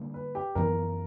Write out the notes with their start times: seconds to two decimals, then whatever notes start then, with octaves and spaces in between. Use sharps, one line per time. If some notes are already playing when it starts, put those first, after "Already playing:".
Already playing: D3 G3 A#3 D4
0.14 B4
0.35 G4
0.55 F#2 E3 B3 A#4